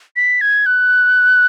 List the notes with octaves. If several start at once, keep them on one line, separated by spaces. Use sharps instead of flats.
B6
G#6
F#6